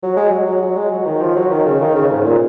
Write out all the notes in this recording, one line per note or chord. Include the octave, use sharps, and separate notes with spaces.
F#3
G#3
F#3
F#3
F#3
G#3
F#3
D#3
F3
F#3
D#3
C#3
D#3
C#3
G#2
A#2